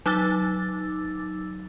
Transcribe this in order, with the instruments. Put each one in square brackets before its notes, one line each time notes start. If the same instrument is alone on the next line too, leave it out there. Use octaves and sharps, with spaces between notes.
[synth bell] F#3 D#4 D6 E6 A6